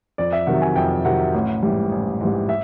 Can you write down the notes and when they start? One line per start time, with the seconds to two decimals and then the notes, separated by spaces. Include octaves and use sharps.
0.18 F2 D5
0.32 E5
0.46 C3 D#3 F#3 F#5
0.62 G#5
0.76 F2 G5
1.05 C3 D#3 F#3 F#5
1.34 A1
1.62 G#2 E3 G3
1.92 A1
2.21 G#2 E3 G3
2.49 E5